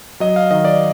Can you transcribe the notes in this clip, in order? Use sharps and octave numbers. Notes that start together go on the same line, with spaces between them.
F#3 D#5
F5
D#3 D#5
D5